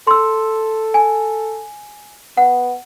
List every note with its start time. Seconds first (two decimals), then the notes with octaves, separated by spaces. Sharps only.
0.07 A4 C6 E6
0.94 G#5
2.37 B3 F#5